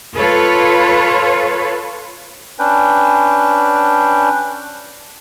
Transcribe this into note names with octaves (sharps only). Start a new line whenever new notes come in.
F4 A4 B4 C#5
C#4 D4 B4 G5